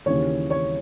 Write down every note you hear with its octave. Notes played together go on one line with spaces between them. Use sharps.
D#2 C#3 E3 C#5
C#5